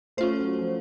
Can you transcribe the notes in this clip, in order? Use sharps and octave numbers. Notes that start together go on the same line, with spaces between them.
A3 C#4 F4 C5
F#3
F3